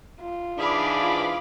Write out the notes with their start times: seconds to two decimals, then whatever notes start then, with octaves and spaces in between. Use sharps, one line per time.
0.22 F4
0.58 G#2 E3 D4 G#4 F5 B5 D6
1.02 F4